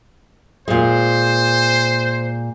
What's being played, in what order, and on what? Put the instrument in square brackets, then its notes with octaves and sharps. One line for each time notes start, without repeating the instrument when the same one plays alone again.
[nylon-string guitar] A#2 G#3 [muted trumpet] C5